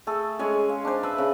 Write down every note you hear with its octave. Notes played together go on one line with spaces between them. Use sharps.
A3 G#4 A4
G#3 C#4 G#5
F5
D4 C5
B4 E5 A5 B5
C#3